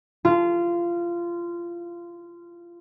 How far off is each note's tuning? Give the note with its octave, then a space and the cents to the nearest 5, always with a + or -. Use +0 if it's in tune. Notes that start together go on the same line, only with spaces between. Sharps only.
F4 -20